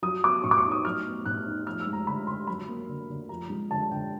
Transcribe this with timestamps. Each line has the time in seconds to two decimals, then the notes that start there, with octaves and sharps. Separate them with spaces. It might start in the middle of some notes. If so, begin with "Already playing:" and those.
0.02 F#3 D#6
0.24 B3 D6
0.44 A2 C#6
0.51 D6
0.57 C#6
0.64 D#4
0.71 D#6
0.85 F#3 F6
1.06 B3
1.26 A2 F#6
1.45 D#4
1.66 F3 F6
1.80 E6
1.87 G#3
1.93 A#5
2.07 D3 B5
2.27 D3 C6
2.47 F#3 B5
2.69 A#3
2.89 D3
3.09 D3
3.29 F3 A#5
3.50 G#3
3.71 D3 A5
3.91 D3 G5